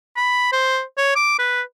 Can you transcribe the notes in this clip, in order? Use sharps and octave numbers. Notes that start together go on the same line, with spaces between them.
B5
C5
C#5
D6
B4